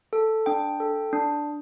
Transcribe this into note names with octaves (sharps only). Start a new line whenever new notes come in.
A4
D4 G5
A4
D4